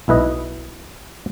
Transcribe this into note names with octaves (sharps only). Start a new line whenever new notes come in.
B1 E4 B4 D#5